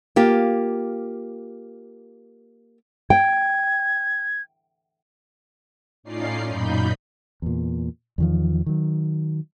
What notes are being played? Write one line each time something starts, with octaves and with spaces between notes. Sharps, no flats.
A#3 F4 G4
G5 G#6
A2 C#4 D#4 F4 D5 C7
F#2 A#2 D#4 B5 G6
E2 A#2
E2 D#3 F3
D#3 F#3